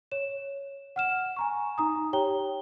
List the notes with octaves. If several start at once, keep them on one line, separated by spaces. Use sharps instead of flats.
C#5 E7
F#5 F6 E7
G#5 A#5 C#6
D#4 A#5 D#6
G4 C#5 G5 A#5 G7